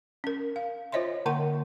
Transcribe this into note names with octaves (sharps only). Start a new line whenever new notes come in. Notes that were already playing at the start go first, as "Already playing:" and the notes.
C#4 A#4
F5
F4 C5 C#5 D#5 E5 C6
D3 A#3 A#4 F#5 C6 C#6